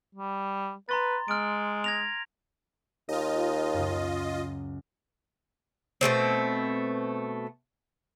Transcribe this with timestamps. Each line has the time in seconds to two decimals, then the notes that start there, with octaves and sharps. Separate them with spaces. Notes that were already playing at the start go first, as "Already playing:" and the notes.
0.15 G3
0.89 B4 A#5 C6 A6
1.28 G#3 F6 D7
1.84 G#6 A#6 F7
3.09 D#2 F4 D#5
3.73 C#2 F#2
6.01 B2 F3 A3 C4